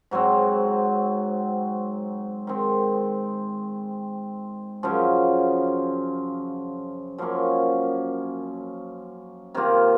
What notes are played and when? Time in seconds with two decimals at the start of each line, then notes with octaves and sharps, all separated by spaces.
0.11 G#2 F#3 C4
2.47 D#3 G#3 C4
4.83 F#2 C#3 F3
7.18 F#2 F3 A#3 C#4
9.54 C3 D#3 A#3 F4